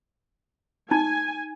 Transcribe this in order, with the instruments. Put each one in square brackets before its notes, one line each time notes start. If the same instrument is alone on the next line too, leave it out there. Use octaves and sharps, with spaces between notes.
[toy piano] D#4 [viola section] G#5